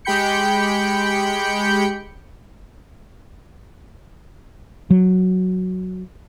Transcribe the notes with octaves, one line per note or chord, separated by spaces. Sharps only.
G#3 G4 G5 B5 G6 C#7
F#3